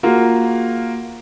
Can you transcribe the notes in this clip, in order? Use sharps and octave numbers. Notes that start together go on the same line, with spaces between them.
A#3 F4 F#4 G#4